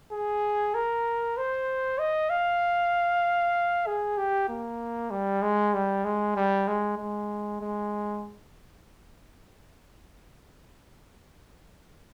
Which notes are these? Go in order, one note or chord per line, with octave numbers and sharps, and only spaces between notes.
G#4
A#4
C5
D#5
F5
G#4
G4
A#3
G3
G#3
G3
G#3
G3
G#3
G#3
G#3